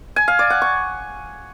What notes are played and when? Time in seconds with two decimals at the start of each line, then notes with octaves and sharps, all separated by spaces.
0.16 G#5
0.28 F5
0.39 D5
0.50 F#5
0.62 C#6